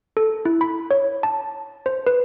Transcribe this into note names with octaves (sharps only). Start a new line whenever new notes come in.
A4
E4
B5
C#5
A5
C5
B4